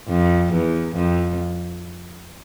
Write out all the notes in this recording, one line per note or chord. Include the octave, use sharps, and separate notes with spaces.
F2
E2
F2